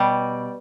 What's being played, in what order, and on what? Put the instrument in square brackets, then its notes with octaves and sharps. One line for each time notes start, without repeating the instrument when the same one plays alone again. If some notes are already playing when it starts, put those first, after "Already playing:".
Already playing: [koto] B2 G3